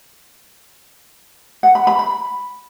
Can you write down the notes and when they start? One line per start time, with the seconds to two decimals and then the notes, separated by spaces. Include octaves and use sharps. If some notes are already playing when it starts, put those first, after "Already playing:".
1.63 F#5
1.75 B5
1.87 B5
1.99 B5